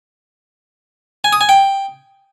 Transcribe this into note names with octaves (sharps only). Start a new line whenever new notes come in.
G#5
D#6
G#5
G5